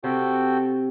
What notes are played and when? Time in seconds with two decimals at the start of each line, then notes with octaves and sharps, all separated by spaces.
0.04 C3 F#4 A4 G5